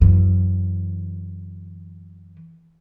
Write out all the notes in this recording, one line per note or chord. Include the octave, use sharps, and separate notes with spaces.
F#2 E3